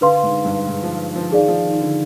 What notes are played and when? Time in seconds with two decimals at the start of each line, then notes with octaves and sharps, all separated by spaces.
0.01 D3 B4 F5 C6
0.23 G#2
0.45 G2
0.67 G#2
0.83 F3
1.16 F3
1.32 D#3 G#4 D5 F5
1.48 F3
1.65 D#3
1.81 D3